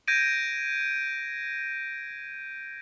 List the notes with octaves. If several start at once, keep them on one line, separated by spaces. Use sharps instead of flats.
G6 G#6 A#6 D7 D#7